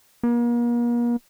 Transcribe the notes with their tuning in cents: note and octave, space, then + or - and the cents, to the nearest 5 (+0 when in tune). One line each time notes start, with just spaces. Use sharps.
A#3 +40